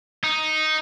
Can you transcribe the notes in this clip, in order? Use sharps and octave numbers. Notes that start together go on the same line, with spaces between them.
D#4